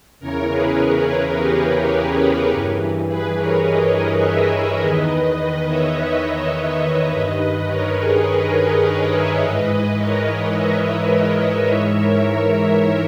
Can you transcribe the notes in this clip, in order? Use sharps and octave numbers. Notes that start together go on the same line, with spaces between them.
E2 C#3 E3 A#4 C#5
G#4 B4
G#4 B4
G4 A#4
G4 A#4
G#4
G2 E3
G#4 B4
A#4 C#5
B4 D#5
B4 D#5
C#5 E5
B4 D#5
E2 D#3
B4 D#5
C#5 E5
C#5 E5
B4 D#5
C#5 E5
G2 D#3 B4 D#5
A#4 C#5
G#4 B4
A#4 C#5
B4 D#5
A#4 C#5
C#5 E5
G#2 E3 B4 D#5
B4 D#5
A#4 C#5
C#5 E5
G#2 E3 C#5 E5
A#4 C#5